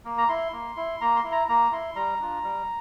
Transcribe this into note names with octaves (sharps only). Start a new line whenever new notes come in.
A#3
A#5
E4 C6
A#3
E4
A#3 A#5
C6
E4
A#5
A#3 A#5
E4 C6
G3 A#5
D4 F4
G3